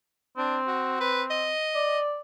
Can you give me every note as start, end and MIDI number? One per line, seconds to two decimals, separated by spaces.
0.38 1.52 60
0.38 0.58 62
0.67 0.95 66
1.00 1.22 71
1.30 1.99 75
1.76 2.21 74